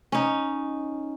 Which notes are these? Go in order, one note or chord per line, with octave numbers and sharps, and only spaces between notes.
C#4 D#4